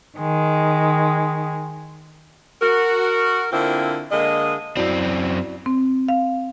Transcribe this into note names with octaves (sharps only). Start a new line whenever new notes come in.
D#3 G#3
F#4 A#4
D3 A#3 C4 E4 F4
D3 G#3 A#3 D#5
F#2 C4 E4 F#4 D5
C4
F5